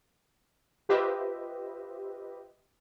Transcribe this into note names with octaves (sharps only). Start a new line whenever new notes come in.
F4 G4 B4 C5 D#5 E5